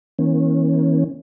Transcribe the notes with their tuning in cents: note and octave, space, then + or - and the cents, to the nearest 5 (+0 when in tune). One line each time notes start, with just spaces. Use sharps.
E3 -40 A#3 +25 C#4 -25